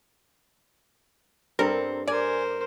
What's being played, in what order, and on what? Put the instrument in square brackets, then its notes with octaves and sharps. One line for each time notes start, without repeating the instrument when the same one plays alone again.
[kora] G2 A4 [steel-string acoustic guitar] C4 [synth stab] A#4
[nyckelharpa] A#4 C5 [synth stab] D5 [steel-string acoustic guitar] G#5